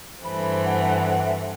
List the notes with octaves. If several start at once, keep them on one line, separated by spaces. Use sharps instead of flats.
G2 E3 A3 C4 B5
F#5
F#5
E5